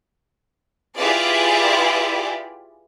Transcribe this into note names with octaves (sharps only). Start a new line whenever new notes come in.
E4 F4 G4 G#4 B4 D5